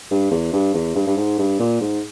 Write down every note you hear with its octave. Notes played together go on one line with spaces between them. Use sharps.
G2
E2
G2
E2
G2
G2
G#2
G2
A#2
G#2